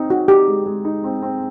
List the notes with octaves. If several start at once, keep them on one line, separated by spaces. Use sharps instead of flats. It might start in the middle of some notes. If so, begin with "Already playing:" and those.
Already playing: C4 D#4
D#4 F#4
D#4 G4
G#3
G#3
D#4
C4
C4